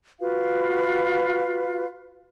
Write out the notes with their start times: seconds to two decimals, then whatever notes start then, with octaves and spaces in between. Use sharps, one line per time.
0.20 F4 F#4 B4 F5